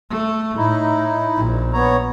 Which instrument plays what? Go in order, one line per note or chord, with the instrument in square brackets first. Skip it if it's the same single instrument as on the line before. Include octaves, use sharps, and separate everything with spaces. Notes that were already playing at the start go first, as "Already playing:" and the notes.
[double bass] A3
[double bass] A2 [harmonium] D#4 E4
[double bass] A#1
[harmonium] B3 C#5 A#5